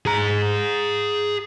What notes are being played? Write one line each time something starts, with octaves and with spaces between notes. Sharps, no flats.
G#4 A#5